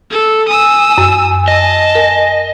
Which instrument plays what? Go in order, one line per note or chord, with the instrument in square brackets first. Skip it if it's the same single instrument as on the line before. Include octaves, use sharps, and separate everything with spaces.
[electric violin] A4
[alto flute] G#5 [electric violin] D#6 E6
[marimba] F#2
[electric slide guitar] D#5 [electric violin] A5
[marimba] A#4 [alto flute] G#5